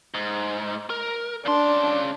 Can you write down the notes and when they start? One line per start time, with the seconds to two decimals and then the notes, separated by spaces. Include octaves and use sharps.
0.14 G#2
0.90 A#4
1.46 C#3 D4 C6